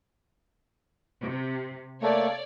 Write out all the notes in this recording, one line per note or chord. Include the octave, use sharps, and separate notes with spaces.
C3
A3 A#3 C#5 D5